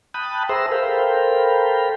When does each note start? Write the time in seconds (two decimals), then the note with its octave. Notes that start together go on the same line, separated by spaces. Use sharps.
0.14 G5 A5 B5 D#6 F#6
0.49 G#4 C5 E5 A#5 C6 E6
0.72 A4 A#4 C5 F5 G5 B5